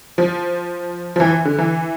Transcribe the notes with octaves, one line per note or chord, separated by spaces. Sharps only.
F3
F3
E3
D3
E3